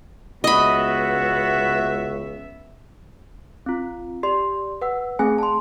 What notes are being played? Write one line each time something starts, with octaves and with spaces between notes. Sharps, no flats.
C#2 B3 F#4 D#5 E5 B5
C4 F4
G4 D5 C6
B4 F#5 E6
A3 C4 G#4 G#5
A5 C6